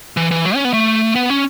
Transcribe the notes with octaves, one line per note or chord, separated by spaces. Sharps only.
E3
E3
F#3
C#4
B3
A3
B3
C#4